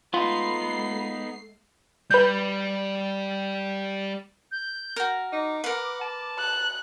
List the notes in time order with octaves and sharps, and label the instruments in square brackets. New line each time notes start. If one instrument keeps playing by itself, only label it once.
[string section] G#3 A3 C7 [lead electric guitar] B3 D#4 [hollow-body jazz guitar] F4 [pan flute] B5
[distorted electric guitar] G3 [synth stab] B4 G6
[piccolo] G6
[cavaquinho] F#4 A#4
[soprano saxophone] D#4 [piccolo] D6
[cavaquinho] A#4 B4 [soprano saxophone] F#5
[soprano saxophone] A5
[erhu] F#6